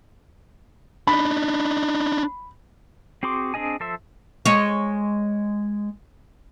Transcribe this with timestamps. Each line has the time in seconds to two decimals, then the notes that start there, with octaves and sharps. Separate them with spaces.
1.07 D4 D#4 B5
3.23 C4 F#4 G#4 C6 D6
3.54 C4 D4 G#4 D#5 G#5
3.80 F3 A4 C5 E5
4.45 G#3 C#5